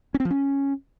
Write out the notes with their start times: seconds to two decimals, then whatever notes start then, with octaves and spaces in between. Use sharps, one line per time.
0.14 C#4
0.20 C4
0.25 F3
0.31 C#4